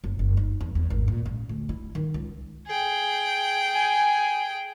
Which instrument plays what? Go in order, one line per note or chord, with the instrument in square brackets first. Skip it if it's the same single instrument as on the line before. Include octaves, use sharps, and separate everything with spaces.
[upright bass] F#1
F#1
D#4
E2
E2
G#1
A#2
C#3
D2
E4
D#3
C#2
[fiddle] G#4 G5
[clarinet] G#5